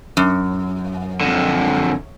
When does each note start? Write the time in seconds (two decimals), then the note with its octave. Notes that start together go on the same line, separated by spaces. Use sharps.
0.17 F#2
1.21 F2 D3